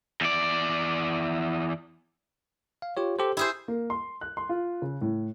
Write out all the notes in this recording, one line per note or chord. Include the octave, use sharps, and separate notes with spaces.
E2 D5
F5
F4 G4 C#5
G4 A4 C5
E4 G4 G#4 C5
A#3
C6
F#6
C6
F4
C#3
A2